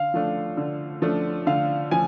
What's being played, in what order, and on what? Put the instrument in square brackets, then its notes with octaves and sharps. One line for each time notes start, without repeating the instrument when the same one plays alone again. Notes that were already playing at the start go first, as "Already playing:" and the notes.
Already playing: [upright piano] D3 [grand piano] F5
[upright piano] F3 A3 D4
D3
F3 A3 D4
[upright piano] D3 [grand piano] F5
[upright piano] F3 [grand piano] G#5